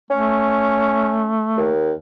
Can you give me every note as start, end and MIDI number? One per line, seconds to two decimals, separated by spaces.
0.10 1.71 57
0.10 1.33 61
1.57 1.93 39